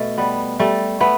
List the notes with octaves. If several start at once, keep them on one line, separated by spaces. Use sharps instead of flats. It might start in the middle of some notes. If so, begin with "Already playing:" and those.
Already playing: B2 A3
G3 B3
G3 A3
A3 B3